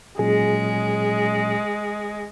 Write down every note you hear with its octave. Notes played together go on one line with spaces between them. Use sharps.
A#2 F#3 G#3 C#4 G#4